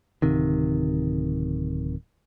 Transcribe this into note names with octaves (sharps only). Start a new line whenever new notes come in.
D1 C3 D#3